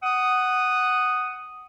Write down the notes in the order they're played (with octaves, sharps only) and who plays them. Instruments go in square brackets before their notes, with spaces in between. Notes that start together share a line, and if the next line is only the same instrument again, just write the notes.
[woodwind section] F#5 D#6